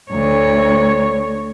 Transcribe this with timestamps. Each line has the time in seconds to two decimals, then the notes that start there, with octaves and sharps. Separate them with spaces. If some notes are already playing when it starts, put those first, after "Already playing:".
0.12 D2 C#5